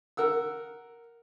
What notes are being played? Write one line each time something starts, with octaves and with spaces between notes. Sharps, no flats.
A#4 F#5 E6